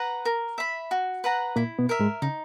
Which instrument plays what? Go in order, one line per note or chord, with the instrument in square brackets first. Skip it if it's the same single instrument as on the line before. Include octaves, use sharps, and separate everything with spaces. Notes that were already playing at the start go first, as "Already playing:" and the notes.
Already playing: [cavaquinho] B4 F#5 A#5
A#4
E5 B5
F#4
B4 F#5 A#5
[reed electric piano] A#2 A#3 [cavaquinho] E4
[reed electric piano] B2 B3
[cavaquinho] A#4 E5
[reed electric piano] G#2 G#3
[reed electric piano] C#3 [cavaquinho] D#4